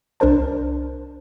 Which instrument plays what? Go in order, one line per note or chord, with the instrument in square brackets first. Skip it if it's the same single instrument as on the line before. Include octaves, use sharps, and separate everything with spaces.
[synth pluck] C2 D4 A#4 C5 A5